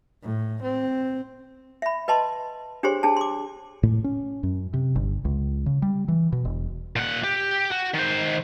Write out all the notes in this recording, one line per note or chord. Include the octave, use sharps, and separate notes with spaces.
A2
C4
E5 B5
B4 D#5 A5 C6
D4 G4 G#4 C5 C#5 C6
D4 G#4 A5
C6 D6
A2
C#4
F#2
C3
G1
C#2
C#3
G3
E3
B2
E1
A#2 F#5
G4
F#4
D#3 C5